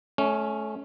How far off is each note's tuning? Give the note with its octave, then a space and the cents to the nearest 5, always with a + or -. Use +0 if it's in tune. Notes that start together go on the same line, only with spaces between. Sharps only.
A3 -25 C#4 +0